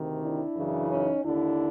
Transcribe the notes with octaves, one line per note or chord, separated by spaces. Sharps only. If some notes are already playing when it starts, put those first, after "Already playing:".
Already playing: D2 C3 D#3
D4 E4
F#2 C#3 E3
C#4 D#4
D#2 D3 D4 E4